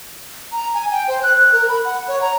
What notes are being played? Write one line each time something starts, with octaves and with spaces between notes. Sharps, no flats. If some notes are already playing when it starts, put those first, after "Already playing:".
A#5
G#5
G5
C5
F#6
A#4
B5
F#5
C#5
A#5